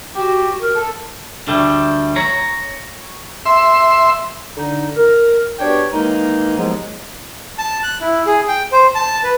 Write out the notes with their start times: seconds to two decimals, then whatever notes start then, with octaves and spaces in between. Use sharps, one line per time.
0.15 F#4 G4
0.61 A#4
0.75 A4
1.47 D2 G3 A3
2.16 C#5 A#5
3.46 E5 C6
4.56 D3 D#4
4.96 A#4
5.59 B3 D4 F#4 G4 C#5 G5
5.92 D#3 E3 G#3 A#3 D#4
6.57 D#2 G#2 F3 F#3 G#3 B3
7.58 A5
7.83 F#6
8.01 E4
8.26 G#4
8.48 G5
8.72 C5
8.95 A5
9.24 B4